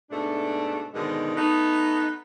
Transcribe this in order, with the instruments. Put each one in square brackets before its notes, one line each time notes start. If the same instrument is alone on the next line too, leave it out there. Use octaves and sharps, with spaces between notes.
[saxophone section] G#2 B2 A3 D4
G#2 B2 D3 D#3 G#3
A3 B3 D#4